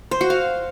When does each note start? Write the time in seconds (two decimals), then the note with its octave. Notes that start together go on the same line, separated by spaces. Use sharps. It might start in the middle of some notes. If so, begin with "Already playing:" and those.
0.11 C5
0.21 F#4
0.30 F5